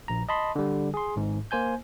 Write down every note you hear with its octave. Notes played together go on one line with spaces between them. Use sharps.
A#1 A#5
D#5 A5 B5 C6
D3 G3
G#4 C6
G#1 G#2
A#3 C5 G#5 G6